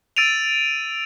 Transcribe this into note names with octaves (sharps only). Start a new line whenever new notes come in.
E6 A6 D7 D#7 F7